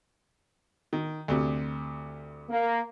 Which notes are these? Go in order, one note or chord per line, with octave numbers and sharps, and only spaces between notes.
D#3
D2 C3
A#3